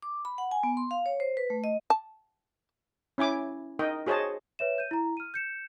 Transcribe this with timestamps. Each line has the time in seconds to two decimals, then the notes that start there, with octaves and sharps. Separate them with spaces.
0.02 D6
0.25 B5
0.38 F#5
0.51 G#5
0.63 B3
0.77 C6
0.91 F5
1.06 C#5
1.20 C5
1.37 B4
1.50 A3
1.64 D#5
1.90 A5
3.18 C#4 E4 G#5 D6
3.79 D#4 A#4 D#5 G5
4.06 F#4 G#4 C5 C#5 D#5 A5
4.59 B4 C#5 E5 E7
4.78 G6 D#7
4.91 E4 A#5
5.17 F6 D#7
5.34 G6 C#7 E7